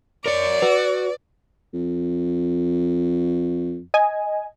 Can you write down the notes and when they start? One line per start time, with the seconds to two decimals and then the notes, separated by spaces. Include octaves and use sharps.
0.26 A#4 C#5 D5
0.62 F#4 B4
1.74 F2
3.94 D#5 G#5